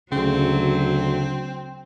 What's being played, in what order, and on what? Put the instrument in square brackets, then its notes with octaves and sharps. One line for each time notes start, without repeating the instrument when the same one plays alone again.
[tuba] D2 [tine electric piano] C#3 [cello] F#3 [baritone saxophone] C4